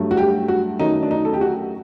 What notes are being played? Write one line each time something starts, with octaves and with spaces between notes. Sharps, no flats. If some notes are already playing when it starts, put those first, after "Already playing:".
Already playing: G2 F#3 A3
F#4
G4
F#4
F#2 D#3 F#3 A3 D#4
D4
D#4
A4
G4
F#4